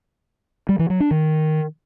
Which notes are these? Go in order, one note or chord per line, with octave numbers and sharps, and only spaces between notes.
G3
E3
F#3
D4
D#3